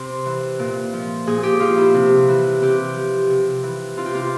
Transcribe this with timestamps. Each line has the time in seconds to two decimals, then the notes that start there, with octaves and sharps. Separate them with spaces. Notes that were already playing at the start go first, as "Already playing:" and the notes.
Already playing: C3 C5
0.26 E3
0.59 A#2
0.93 F3
1.27 A#2 G#4
1.43 G4
1.60 F3 F4
1.78 E4
1.94 C3
2.28 E3
2.62 C3 G4
2.95 F3
3.30 C3
3.63 E3
3.97 C3 F4
4.06 G4
4.15 F4